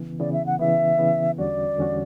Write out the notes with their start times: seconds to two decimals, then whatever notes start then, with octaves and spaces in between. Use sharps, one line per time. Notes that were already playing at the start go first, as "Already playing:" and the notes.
Already playing: C#3 E3 B3
0.20 C#3 E3 B3 D5
0.33 E5
0.46 F#5
0.59 C#3 E3 B3 E5
0.99 C#3 E3 B3
1.38 E2 D3 G3 C#4 F#4 D5
1.79 E2 D3 G3 C#4 F#4